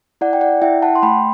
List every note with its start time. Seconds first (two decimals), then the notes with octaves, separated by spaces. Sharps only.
0.21 E4 D5 F#5
0.33 G5
0.41 D5 F#5
0.62 E4 E5 G5
0.82 F#5 A5
0.96 C6
1.02 A3 G5 B5